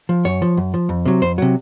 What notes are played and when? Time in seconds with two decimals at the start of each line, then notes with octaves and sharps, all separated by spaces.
0.09 F3
0.25 F#2 C#5
0.42 F3
0.57 F#2
0.74 F3
0.89 F2
1.06 C3 F#3
1.22 F2 C5
1.38 C3 F#3